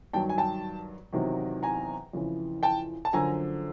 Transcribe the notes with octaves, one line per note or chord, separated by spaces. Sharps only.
G2 D#3 F#3 G5 A5
G#5
G5 A5
E2 C3 D#3 F#3
G#5 A#5
F2 C#3 E3
G5 A5
A5
F#2 D3 F3 G#5 A#5